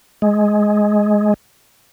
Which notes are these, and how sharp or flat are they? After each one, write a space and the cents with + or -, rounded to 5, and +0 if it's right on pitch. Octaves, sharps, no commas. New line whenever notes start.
G#3 +10